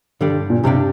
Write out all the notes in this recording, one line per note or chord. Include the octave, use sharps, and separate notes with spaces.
G2 D3 G3 D4 G4
A#2
G2 C3 G3 D4 G4